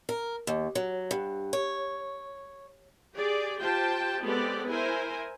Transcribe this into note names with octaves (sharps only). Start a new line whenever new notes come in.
A#4
D#2
F#3
G2
C#5
G4 G#4 D5
F4 G4 C5 G5 A5
G#3 B3 C4 G4 A4 D5
E4 A#4 C5 G#5